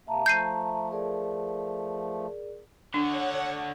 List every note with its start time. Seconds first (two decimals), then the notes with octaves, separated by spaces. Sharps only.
0.07 C3 A#3 E5 A5 A#5
0.26 F3 A3 G6 C7 D#7
0.92 G#4 A#4 D5
2.94 D3 D4 F#4 C#5 F#5